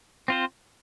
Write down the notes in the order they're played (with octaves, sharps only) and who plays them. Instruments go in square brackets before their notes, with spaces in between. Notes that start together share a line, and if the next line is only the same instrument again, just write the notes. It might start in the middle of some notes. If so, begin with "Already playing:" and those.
[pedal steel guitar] C4 F4 C5